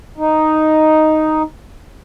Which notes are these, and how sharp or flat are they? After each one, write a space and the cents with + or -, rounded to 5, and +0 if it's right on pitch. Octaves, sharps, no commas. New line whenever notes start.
D#4 +0